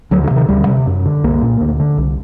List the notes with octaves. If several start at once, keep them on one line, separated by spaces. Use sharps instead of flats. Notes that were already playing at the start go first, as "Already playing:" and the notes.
D2 F#3
D3
C3
D#3
D2 G3
C3
F#2
D3
C2 A#3
A#2
D2
D3
C2